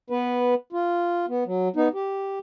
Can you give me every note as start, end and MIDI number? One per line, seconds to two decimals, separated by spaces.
0.10 0.54 59
0.10 0.54 71
0.73 1.26 65
1.29 1.44 59
1.46 1.68 54
1.76 1.88 59
1.76 1.88 63
1.94 2.39 67